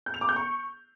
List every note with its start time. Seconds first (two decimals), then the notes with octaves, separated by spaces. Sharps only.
0.06 G6
0.14 F7
0.21 D6
0.29 G6
0.36 C#6